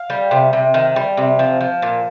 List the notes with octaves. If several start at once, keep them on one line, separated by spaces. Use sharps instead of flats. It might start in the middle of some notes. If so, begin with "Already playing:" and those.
Already playing: F5
G3
C3
C3
D#3
G3
C3
F3
F3
A#2